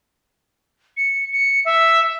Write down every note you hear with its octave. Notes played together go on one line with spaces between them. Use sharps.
C#7
C#7
E5